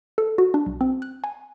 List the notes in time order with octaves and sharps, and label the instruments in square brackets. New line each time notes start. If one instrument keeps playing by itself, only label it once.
[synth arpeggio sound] A4
F#4
D4
B1
C4
F#6
G#5